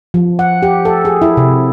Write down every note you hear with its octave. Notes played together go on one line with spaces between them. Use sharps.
F3
F#5
G4
A4
G#4
E4
C3